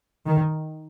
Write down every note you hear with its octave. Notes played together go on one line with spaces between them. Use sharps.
D#3